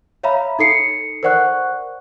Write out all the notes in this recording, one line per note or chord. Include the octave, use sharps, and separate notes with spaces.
C#5 E5 F5 A#5 B5
D#4 A4 C7 C#7
A#4 C5 D5 F#5 C#6 F#6